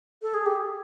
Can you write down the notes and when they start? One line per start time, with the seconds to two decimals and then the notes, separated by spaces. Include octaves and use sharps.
0.22 A4
0.34 G#4
0.46 G4